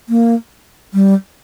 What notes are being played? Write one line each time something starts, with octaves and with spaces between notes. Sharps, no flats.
A#3
G3